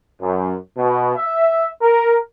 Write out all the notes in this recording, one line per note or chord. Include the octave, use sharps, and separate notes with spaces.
F#2
B2
E5
A#4